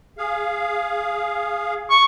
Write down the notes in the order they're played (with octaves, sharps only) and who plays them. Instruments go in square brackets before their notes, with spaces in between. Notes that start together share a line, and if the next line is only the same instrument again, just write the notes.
[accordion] G#4 F5
[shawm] C#6